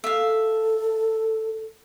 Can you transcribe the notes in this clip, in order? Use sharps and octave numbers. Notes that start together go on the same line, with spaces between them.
A4 E5 F5